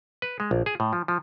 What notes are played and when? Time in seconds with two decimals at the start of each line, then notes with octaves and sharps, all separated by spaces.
0.22 B4
0.40 G#3
0.51 A#1
0.66 G#4
0.80 A2
0.93 F3
1.08 F3